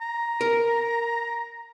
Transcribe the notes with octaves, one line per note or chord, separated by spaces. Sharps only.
A#5
A#4